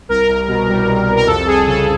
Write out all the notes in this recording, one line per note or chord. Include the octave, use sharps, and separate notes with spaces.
C2 A#4
C2
B2
G3
C2
C2
A#4
F2 A4
F2 G#4
C#3 A4